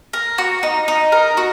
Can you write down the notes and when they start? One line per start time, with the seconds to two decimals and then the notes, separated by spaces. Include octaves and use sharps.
0.13 A#4
0.38 F#4
0.63 D#4
0.88 D#4
1.12 A#4
1.37 F#4